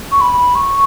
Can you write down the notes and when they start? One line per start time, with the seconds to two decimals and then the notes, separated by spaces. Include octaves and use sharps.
0.12 C#6
0.21 B5
0.55 C#6